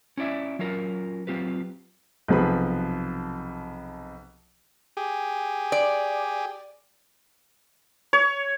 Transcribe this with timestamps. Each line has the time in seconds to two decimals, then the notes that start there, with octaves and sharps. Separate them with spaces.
0.17 C#4 E4 D5 E5
0.59 F#3 C#4 F4 A#4
1.27 F#3 C4 F4 G4 B4
2.28 B1 C3 F3 G#4 B4 B5
4.97 G4 G#4
5.72 D5
8.13 C#5